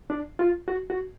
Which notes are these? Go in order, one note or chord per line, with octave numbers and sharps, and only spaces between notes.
D4
F4
F#4
F#4